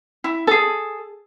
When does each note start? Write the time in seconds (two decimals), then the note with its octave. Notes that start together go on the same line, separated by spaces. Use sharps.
0.24 E4
0.47 G#4 A4